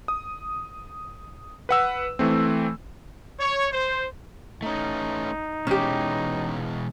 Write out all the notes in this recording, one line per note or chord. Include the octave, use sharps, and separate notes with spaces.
D#6
B4 F#5 E6
E3 A3 C4
C#5
C5
A3 C#4 D#4
B2 E3 G#3 C#4 G4